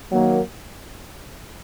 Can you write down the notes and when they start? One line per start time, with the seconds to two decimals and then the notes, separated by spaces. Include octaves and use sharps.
0.12 D#3 F#3 A#3